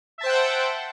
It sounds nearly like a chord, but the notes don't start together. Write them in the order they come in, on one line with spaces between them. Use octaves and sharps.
E5 A5 C5 G5 F#5